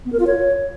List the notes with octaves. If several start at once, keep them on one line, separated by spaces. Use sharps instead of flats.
B3
A#4
F4
C#5